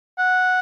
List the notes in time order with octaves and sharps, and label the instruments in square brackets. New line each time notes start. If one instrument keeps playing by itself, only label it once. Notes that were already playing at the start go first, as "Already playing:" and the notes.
[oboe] F#5